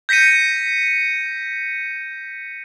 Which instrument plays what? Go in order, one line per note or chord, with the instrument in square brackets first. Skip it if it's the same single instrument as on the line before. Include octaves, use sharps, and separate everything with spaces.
[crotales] G6 A#6 B6 C#7 D#7